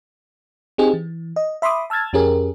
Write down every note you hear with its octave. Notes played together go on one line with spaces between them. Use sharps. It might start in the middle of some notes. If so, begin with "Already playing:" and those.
C4 D#4 G4 G#4
E3
D#5
E5 B5 C6 D6 D#6
A5 E6 F6 G#6 A6
F2 C#4 G4 G#4 A#4